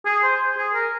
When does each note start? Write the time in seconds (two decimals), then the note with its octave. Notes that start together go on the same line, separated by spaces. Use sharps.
0.06 G#4
0.23 C5
0.57 G#4
0.75 A#4